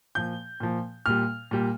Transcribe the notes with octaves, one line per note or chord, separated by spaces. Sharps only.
A#2 F3 G6
A#2 F3
A#2 G3 F6
A#2 G3